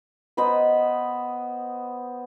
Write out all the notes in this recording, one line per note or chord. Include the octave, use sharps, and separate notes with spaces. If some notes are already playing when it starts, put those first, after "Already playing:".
B3 C5 D#5 B5